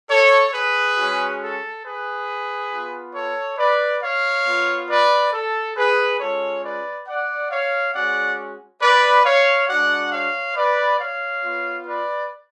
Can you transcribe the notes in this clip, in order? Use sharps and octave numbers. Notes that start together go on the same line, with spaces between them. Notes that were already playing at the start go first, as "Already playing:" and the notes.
A4 C#5
G#4 B4
G#3 C#4 F#4
A4
G#4 B4
B3 F4
A4 C#5
B4 D5
C#5 F5
B3 F4
B4 D5
A4
G#4 B4
G#3 C#4 F4 A4 C#5
B4 D5
D5 F#5
C#5 F5
G#3 C#4 F#4 D5 F#5
B4 D5
C#5 F5
G#3 D4 F#4 D5 F#5
C#5 F5
B4 D5
C#5 F5
B3 F4
B4 D5